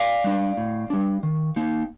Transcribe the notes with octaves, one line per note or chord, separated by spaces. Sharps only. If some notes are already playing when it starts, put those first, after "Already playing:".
Already playing: D5 F5
G3 D4
A2
G3 D4
D#3
A#3 D#4